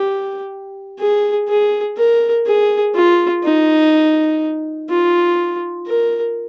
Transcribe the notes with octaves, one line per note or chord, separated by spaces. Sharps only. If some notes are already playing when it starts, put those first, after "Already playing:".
Already playing: G4
G#4
G#4
A#4
G#4
F4
D#4
F4
A#4